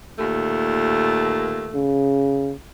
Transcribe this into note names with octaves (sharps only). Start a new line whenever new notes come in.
D#2 A#2 A3
C#3